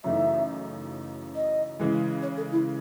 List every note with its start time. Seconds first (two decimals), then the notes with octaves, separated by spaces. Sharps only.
0.04 F#2 C#3 E3 A3 D#4 E5
1.35 D#5
1.80 C#3 E3 G#3
2.22 C#5
2.37 A4
2.52 E4